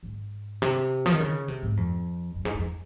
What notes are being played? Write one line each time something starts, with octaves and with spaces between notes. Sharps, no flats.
G#2
C3
F3
D#3
C#3
C3
G#2
F2
F#2
G#2
F2